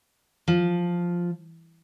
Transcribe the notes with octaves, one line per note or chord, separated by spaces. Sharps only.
F3